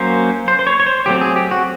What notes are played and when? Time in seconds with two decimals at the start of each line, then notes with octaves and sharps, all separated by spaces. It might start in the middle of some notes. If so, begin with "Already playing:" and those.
Already playing: F#3 A#3 C#4 C5
0.48 C5
0.59 C5
0.67 C#5
0.80 C#5
0.86 C5
1.06 F#3 A3 C4 G4
1.21 G#4
1.36 G4
1.51 F#4